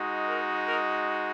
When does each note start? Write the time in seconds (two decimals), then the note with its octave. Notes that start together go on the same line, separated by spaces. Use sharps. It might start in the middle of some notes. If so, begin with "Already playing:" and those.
Already playing: G#3 D#4 F#4
0.25 A#4
0.65 A#4